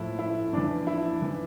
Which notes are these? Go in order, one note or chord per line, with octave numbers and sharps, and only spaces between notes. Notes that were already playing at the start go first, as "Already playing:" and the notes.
Already playing: A2 F3 E4
E4
F2 E3 D4
E4
E3